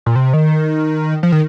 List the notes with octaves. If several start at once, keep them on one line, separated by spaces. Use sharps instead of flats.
A#2
C3
D#3
F3
D#3